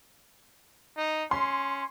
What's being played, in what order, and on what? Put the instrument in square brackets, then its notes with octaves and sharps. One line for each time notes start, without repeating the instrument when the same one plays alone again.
[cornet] D#4
[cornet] C#4 [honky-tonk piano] C6